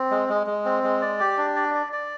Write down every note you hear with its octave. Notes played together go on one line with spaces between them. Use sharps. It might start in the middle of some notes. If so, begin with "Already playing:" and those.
Already playing: C4
G#3
G#3
G#3
C4
G#3
D5
G4
D4
D5
D5
D5